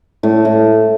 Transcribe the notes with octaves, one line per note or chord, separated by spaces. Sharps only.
A2
A2